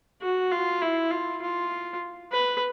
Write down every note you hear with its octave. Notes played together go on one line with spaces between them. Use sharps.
F#4
F4
E4
F4
F4
B4